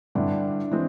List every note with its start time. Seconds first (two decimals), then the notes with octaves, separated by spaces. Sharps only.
0.15 G2 D3 G3 D4 E4
0.71 E3 G#3 C4